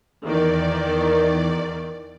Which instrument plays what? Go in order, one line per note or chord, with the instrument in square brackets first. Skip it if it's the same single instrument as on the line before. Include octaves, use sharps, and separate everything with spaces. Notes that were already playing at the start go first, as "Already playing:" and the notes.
[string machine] E2 D5 [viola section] D#3